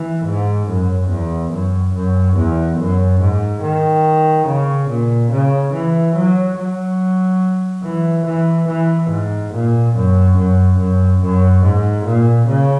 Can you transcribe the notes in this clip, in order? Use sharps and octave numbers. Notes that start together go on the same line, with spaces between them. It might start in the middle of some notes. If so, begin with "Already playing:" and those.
Already playing: E3
G#2
F#2
E2
F#2
F#2
E2
F#2
G#2
D#3
C#3
A#2
C#3
E3
F#3
F#3
E3
E3
E3
G#2
A#2
F#2
F#2
F#2
F#2
G#2
A#2
C#3